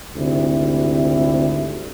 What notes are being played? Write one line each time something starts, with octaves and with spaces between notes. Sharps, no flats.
G#1 D2 C3 E4